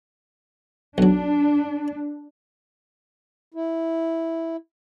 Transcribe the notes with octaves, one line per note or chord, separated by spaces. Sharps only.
B1 F#3 D4
E4